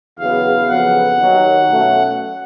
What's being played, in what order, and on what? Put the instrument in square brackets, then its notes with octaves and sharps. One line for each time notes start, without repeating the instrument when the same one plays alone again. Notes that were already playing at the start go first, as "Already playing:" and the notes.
[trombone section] E2 C#3 F#3 B3 [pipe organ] F5
[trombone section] F2 C#3 F#3 B3 [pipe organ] F#5
[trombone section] D#2 D#3 F#3
B2 F#3 A3 C#4